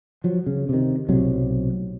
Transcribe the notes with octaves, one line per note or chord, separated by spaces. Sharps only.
F3 F#3
C#3
C3 D#3
B1 A2 C3 F#3